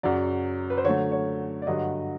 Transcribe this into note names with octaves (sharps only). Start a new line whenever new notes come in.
F#2 C#3 F#3 D5
B4
C5
D3 F#3 A3 C#5
C#5
D5
G2 D3 F#3 D#5